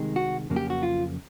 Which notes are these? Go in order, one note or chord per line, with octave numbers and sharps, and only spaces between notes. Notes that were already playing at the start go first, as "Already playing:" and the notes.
Already playing: C2 C3 D#3 G#3
F#4
F2 C#3 F#3 A#3
G4
F#4
F4